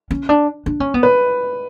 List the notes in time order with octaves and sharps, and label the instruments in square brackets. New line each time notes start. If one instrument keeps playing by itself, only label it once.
[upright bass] C#4
D4
D4
C#4
B3
[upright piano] B4